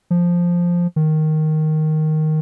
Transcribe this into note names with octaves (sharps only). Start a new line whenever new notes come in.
F3
D#3